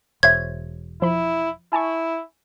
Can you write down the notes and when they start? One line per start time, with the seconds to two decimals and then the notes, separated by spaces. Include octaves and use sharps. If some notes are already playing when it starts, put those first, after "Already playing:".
0.23 E1 C5 C#5 E5 G#6
1.02 F3 E4 B5
1.73 E4 G#5 A5 C#6